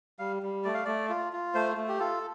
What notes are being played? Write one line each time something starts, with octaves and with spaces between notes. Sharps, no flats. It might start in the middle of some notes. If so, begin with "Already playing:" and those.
G3 F5
G3
A3 D5
F5
A3 D5
F4
F4
A3 C5
A3
G4
F4 A4